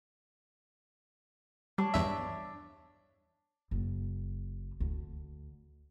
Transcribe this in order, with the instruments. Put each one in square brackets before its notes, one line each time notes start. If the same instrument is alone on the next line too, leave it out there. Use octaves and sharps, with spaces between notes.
[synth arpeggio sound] G3 [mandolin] D4 C#5
[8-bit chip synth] E2 G2 E5
[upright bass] F#1
D2